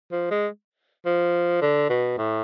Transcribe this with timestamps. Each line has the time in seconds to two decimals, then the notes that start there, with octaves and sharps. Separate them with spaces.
0.12 F3
0.31 G#3
1.06 F3
1.61 D3
1.89 B2
2.18 A2